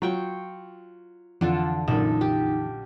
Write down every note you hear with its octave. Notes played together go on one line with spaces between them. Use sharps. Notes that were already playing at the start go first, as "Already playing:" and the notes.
F#3 F4 G5 C#6
F2 D3 E3 F4 A4 F#5
A#1 F#2 D#4 A4
G4